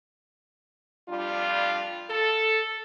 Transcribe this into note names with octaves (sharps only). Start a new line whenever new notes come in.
F2 G3 D4 F4
A4